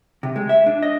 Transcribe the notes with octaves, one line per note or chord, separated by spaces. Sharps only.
C3
G#3
E5
D4
D#5